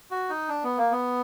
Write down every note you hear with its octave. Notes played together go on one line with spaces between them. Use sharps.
F#4
D#4
D4
B3
A#3
B3